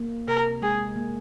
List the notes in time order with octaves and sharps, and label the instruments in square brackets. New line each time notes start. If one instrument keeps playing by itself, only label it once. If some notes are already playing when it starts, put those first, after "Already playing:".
Already playing: [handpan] A#3
[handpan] C3 [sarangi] A#4
[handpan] G#3 [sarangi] G#4
[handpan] A#3